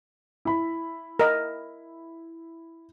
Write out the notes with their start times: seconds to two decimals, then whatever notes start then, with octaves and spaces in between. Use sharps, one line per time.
0.45 E4 B5
1.19 A#4 D#5